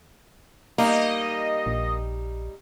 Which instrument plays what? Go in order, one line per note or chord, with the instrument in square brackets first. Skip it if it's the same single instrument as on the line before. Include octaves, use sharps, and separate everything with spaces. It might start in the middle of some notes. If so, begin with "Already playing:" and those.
[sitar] G3 D#4 [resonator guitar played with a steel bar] A#3 [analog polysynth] D#5
[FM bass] A#1